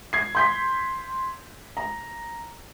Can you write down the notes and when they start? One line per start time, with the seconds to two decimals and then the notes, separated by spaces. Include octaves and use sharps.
0.13 G#6 C7
0.35 C6 G6 B6
1.77 A#5